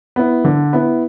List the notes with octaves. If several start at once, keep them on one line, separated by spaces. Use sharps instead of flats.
B3 E4
D3
B3 E4